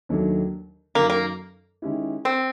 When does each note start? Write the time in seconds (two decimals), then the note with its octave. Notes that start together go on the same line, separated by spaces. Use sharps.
0.09 D#2 D#3 F#3 A3 D4
0.95 F#2 D#3 F#3 A#3
1.10 A#3
1.82 D#3 G#3 C#4 E4 G4
2.25 C4